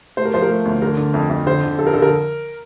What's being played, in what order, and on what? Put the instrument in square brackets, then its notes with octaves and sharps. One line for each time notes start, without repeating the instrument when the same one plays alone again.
[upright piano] A3 C5
A#4
F3 C5
A#4
A3
D2
D3 A#4
D3
F2
F2
D3 C5
D3
F3 A4
A#4
D3 A4
A#4